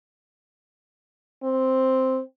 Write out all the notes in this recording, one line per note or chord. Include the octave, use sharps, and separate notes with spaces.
C4